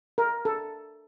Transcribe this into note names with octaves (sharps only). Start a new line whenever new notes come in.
A#4
A4